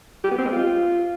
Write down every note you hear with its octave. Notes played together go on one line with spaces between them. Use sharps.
G4
B3
C4
G#3
F4